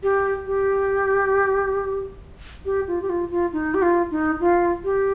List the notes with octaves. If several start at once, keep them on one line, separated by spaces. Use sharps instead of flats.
G4
G4
G4
F4
G4
F4
F4
D#4
G4
F4
D#4
F4
G4